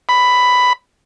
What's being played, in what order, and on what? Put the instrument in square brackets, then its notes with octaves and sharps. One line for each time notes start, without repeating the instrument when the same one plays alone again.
[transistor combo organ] B5